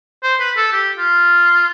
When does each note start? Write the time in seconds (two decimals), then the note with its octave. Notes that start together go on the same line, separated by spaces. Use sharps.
0.23 C5
0.40 B4
0.57 A4
0.73 G4
0.98 F4